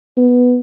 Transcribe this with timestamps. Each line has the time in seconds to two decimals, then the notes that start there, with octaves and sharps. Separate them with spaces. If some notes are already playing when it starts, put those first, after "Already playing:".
0.17 B3